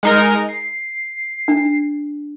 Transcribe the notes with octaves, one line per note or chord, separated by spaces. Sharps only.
G#3 D#4 A#4
C7
D4